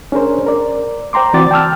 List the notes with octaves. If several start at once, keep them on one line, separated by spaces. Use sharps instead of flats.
C#4 D4 G#4 A#4 C5
A#4 D5
C5 G5 A#5 C6 D6
E3 C4 F#4 D5 D6 A6
G5 A5 E6 F6